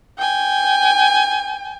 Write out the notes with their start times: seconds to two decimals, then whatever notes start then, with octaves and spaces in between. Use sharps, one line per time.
0.17 G5 G#5